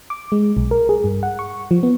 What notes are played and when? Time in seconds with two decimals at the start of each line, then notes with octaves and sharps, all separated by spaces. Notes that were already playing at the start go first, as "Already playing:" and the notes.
0.10 D6
0.32 G#3
0.57 B1
0.71 A#4
0.89 G#4
1.04 G2
1.23 F#5
1.39 C#6
1.71 F3
1.83 B3